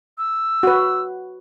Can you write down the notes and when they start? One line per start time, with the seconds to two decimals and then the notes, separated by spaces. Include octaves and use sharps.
0.18 E6
0.63 F#4 B4